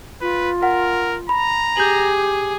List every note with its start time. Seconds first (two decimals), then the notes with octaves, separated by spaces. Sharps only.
0.21 F4 B4
0.63 A#4 F#5
1.29 A#5 B5
1.77 G4 G#4 G6 F#7